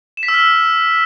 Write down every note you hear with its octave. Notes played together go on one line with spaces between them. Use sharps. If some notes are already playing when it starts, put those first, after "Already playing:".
E7
B6
E6
F6